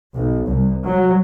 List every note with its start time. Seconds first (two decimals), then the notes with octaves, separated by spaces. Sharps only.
0.14 B1
0.47 C2
0.84 F#3